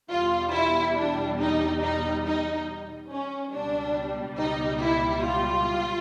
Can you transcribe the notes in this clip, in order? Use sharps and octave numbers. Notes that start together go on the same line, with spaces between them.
E2 B2 G3 F4
E4
D4
D#4
D#4
D#4
C#4
C#2 B2 G3 D4
D#4
E4
F4